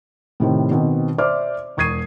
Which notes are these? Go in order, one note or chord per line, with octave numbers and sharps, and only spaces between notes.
A2 C3 D#3 C4
B2 D#3 C4
C5 D5 E5 D6 F6
E1 C#6 D#6 G#6 C7 D#7